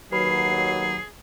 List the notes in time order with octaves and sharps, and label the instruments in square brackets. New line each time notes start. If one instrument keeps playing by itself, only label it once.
[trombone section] D#2 F#3 [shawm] G#4 [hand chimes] B4 B5 [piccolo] C7